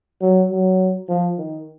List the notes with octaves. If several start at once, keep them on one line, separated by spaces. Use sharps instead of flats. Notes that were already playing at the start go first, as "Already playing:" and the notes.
F#3
F#3
F3
D#3